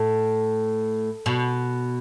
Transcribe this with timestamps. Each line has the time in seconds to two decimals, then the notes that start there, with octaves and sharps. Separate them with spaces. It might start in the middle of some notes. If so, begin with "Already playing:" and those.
Already playing: A2
1.26 B2